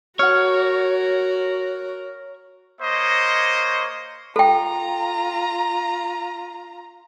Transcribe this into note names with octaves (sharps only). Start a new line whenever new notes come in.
F#4 A#4 C#5 F#5 F6
A#3 C5 C#5 D#5
F4 A4 G5 A#5